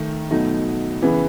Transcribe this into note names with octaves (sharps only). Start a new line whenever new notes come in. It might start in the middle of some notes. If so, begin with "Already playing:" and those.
Already playing: D#3 A3
B2 F#3 A3 D#4
C#3 E3 B3